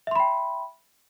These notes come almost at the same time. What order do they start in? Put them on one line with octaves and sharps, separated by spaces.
E5 C6 B5 G5